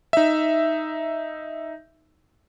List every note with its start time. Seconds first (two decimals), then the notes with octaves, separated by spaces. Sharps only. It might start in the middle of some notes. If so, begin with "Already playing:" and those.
0.13 D#4 E5